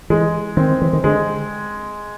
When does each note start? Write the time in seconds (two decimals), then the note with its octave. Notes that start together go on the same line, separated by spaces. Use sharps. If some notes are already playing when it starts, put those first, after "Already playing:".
0.10 E3 G#3
0.57 D#3 C4
0.82 E3
0.93 D#3
1.04 D3 G#3